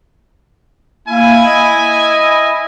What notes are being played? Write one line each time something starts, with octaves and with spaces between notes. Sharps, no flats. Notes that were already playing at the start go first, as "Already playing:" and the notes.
A#3 E4 G#5
D#5